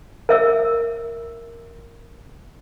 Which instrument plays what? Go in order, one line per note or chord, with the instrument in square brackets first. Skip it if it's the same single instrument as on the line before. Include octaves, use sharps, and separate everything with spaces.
[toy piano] A#4 E5 E6